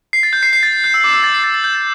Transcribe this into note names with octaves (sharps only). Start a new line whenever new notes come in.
C7
A6
G6
C7
C7
A6
A6
G6
E6
D6
E6
A6
C7
A6
A6
G6
A6